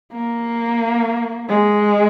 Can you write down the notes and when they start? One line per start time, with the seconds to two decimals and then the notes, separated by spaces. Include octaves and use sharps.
0.13 A#3
1.49 G#3